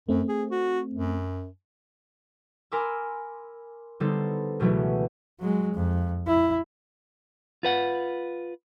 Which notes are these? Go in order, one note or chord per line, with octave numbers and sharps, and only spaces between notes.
F#2 A3 C4
G#4
F#4
F#2
A#4 G#5 B5 C6 D6 E6
D3 G3 B3 D#4 A4 C5
C#2 B2 E3 F#3 A3 B3
F#3 G#3
F2
E4
F4 B4 F#5